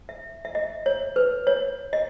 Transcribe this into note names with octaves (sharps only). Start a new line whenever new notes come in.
E5
E5
D#5
C#5
B4
C#5
D#5